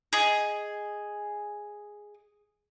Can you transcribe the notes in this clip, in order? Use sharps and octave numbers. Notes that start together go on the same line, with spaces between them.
G#4 D#5